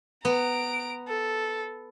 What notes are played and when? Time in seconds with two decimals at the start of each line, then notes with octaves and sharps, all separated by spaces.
0.25 B3 A#5 D7
1.08 A4